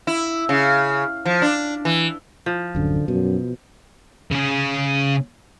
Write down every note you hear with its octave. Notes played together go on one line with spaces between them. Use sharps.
E4
C#3
F3
D4
E3
F3
D1 F#2 D3
F#2 B2
C#3 G#4